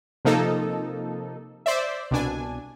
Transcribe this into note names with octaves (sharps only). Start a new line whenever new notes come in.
C3 F3 A#3 D#4 A4
C5 D5 E5
C2 B2 D4 G#5